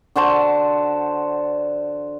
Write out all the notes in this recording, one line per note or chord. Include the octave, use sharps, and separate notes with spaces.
D3 F#4 C5 A5